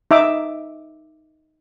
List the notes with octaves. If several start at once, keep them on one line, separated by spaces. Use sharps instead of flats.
D#4 E5 D6